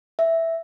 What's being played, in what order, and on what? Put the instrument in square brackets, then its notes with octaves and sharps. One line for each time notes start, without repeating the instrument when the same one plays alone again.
[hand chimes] E5